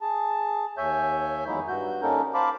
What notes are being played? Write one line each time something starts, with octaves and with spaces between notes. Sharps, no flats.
G#4 A5
D#2 C#5 E5 G#5 G6
E2 F#3 G#3 A#3 D#4 E4
G2 F#4 G6
G3 A#3 C#4 D#4 A4 A#4
A#4 C5 F5 A5 B5 D6